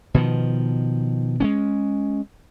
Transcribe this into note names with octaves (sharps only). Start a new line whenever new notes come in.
B2 D#3 F3
G#3 B3 C#4